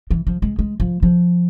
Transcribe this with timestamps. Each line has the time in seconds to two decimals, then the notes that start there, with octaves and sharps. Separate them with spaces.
0.11 E3
0.27 F3
0.42 G#3
0.59 G#3
0.80 F3
1.03 F3